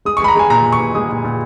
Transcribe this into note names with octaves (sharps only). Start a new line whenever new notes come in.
G#3 D#6
C#6
G#3 B5
A#5
G#3 G#5
A#2 A#5
A#2
C#6
A#2
G#3 D#6
A#2
A#2